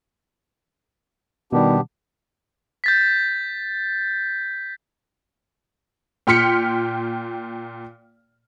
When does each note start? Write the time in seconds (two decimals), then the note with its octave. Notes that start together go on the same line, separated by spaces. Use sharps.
1.53 B2 D#3 G3 B3 D4 G4
2.84 G6 A6 B6
6.27 A#2 G5 C6 F6 B6 C#7